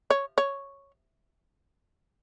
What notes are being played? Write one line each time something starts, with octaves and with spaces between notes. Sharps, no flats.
C#5
C#5